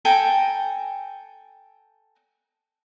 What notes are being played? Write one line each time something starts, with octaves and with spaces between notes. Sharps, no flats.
A4 G5 G#5 A#5